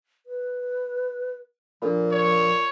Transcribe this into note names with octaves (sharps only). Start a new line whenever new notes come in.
B4
A#2 F3 D4 A4 B5
C#5